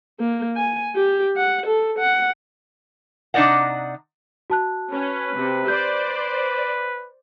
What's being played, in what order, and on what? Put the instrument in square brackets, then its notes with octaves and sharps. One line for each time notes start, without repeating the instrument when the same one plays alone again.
[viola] A#3
G#5
G4
F#5
A4
F#5
[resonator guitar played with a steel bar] C3 D4 D#4 D5 D#5 F#5
[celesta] F#4 A5 F#6
[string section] C#4 [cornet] B4
[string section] C3
[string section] C5 D5 [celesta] G6
[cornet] B4